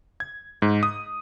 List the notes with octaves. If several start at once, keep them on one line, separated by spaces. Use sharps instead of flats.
G#6
G#2
D#6